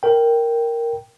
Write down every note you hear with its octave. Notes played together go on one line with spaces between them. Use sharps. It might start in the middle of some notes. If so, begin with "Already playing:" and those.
A#4 G5